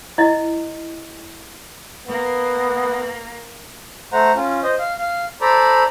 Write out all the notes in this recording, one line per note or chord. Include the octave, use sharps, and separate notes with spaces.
E4 D#5
A#3 B3
A3 C5 F#5 A#5
C#4 F4
C5 D#5
F5
F5
A4 C5 D5 A#5 B5